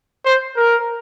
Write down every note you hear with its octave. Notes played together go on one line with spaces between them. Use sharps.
C5
A#4